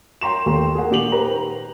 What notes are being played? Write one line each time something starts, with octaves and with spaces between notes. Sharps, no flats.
G5 A#5 C6 E7
D#2 A3 A#4 C6
G#4 A#4 F#5
A#2 D#3 G4 F7 F#7
B4 C5 A#5